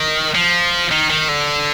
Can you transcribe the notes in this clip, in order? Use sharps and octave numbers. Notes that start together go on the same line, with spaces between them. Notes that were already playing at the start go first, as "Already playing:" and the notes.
Already playing: D#3
F3
D#3
D#3
D3